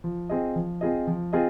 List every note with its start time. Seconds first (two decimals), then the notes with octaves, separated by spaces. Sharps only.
0.04 F3
0.30 C4 F4 G#4 D#5
0.56 F3
0.81 C4 F4 G#4 D#5
1.07 F3
1.33 C4 F4 G#4 D#5